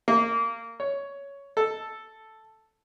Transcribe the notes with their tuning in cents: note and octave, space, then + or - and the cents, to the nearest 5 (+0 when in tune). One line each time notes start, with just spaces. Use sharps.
A#3 -25
C#5 +10
A4 +0